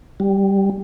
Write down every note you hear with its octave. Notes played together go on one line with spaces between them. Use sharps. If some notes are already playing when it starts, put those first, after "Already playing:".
G3